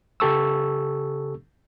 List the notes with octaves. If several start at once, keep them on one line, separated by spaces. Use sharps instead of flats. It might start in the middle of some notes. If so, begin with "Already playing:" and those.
C#3 G4 A4 C#6 E6